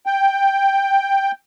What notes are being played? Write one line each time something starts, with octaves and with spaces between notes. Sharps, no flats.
G5